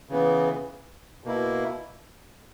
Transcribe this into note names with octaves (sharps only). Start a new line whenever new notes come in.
C#3 E3 B3
B2 A#3 E4